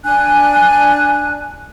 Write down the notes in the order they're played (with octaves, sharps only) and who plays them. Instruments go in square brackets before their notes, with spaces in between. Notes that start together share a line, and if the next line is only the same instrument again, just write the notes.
[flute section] D4 G#5 F#6